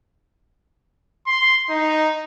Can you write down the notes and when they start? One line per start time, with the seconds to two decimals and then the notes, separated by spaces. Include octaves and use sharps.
1.27 C6
1.69 D#4